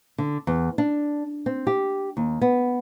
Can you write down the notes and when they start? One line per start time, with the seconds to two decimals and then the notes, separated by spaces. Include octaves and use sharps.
0.18 D3
0.47 E2
0.78 D4
1.46 C4
1.67 G4
2.17 D#2
2.41 B3